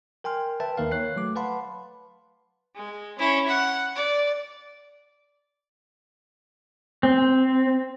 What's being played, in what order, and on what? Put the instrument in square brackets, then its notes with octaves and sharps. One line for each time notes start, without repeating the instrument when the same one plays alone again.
[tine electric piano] A#4 G5 G#5 C6 F6
B4 E5 G5 A5
D#2 D#3 A#3 A#4 B4 F5
C#5 F#6 C7
F#3 A3 D6
B4 F5 F#5 A5 B5 C6
[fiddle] G#3
C#4 E4
F#5
D5
[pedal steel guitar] C4